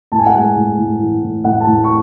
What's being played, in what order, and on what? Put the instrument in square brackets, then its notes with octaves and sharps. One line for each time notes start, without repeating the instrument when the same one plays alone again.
[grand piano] A2 A5
G#5
F#5
G#3 G#5
A2
A2
E3
A2
A2 F#5
A5
A2
C#6